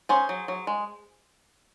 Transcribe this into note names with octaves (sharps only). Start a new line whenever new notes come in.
C#4 G#4 C5
F#3
F#3
G#3